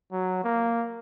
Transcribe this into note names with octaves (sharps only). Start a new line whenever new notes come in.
F#3
A#3